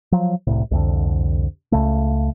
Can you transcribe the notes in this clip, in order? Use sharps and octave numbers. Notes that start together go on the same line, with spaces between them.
F3 F#3
E1 C2 A2
C2 F2 D3
C#2 C#3 A3